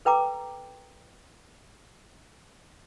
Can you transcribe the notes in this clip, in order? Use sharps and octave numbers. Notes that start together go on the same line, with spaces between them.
A4 B4 G5 A#5 D6